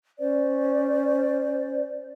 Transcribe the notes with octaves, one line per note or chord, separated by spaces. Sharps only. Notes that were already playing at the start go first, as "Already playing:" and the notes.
C#4 C5 D5